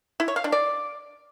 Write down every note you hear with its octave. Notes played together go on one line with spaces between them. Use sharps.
E4
C#5
F5
D4
D5